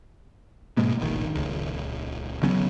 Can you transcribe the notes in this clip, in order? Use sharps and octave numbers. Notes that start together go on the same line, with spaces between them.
G#2 B2 G#3 A#3
F1 A#1 D#3
D#1 C#2
C#3 F#3 B3 C#4